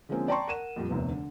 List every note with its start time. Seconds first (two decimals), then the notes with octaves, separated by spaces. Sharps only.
0.09 D3 F3 G#3 A#3 C4 C#4
0.28 D5 G5 A5 A#5 C6 C#6
0.47 A#4 F#5 D#7 E7
0.76 F2 A#2 F3 G3
0.89 F1 D#2 C3 B3
1.09 D3